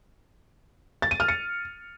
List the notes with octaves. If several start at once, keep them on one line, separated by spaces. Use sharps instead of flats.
A6
D#7
F6
C#7